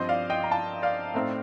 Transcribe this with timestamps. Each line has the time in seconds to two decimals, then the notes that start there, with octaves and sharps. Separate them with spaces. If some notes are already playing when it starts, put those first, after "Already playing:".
Already playing: G2 F3 C4 C5 D#5
0.09 D5 F5
0.30 D#5 G5
0.44 A#5
0.51 F5 A5
0.82 D5 F5
1.14 A2 A3 C4 D#4